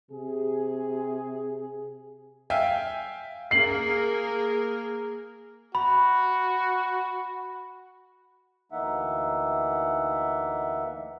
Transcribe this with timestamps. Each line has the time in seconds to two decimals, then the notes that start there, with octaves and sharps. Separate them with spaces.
0.11 C3 G#4
2.50 E5 F5 G5 G#5
3.51 A#3 G#4 A#4 C7 F#7
5.75 F#4 B5
8.72 D2 E3 A#3 D#4 E5 F#5